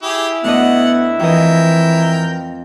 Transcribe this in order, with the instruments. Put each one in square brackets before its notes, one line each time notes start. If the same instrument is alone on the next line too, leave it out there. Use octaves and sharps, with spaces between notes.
[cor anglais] E4 [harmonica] G4 G#4
[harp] D2 D4 D#5 [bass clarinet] B3 [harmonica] F#5
[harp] F2 D#5 [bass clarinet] E3 [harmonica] A#4 G5